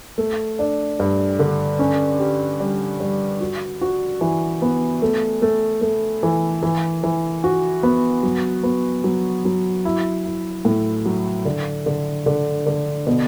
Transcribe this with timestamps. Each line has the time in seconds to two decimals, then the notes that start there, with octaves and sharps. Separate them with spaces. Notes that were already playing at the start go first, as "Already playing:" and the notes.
0.18 A3
0.59 D4
1.00 G2
1.39 D3
1.79 C#4
2.19 G4
2.60 G3
3.00 G3
3.41 F#4
3.81 F#4
4.21 E3
4.62 B3
5.02 A3
5.42 A3
5.81 A3
6.23 E3
6.63 E3
7.03 E3
7.44 F#4
7.83 B3
8.23 F#3
8.63 B3
9.04 F#3
9.45 F#3
9.85 E4
10.25 E4
10.65 A2
11.06 F#3
11.45 D3
11.86 D3
12.26 D3
12.66 D3
13.07 B2